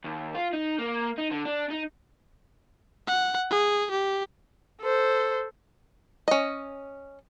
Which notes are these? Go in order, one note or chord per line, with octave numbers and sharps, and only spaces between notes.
D#2
F4
D#4
A#3
D#4
D3
D4
D#4
F#5
G#4
G4
A4 C5
C#4 D#5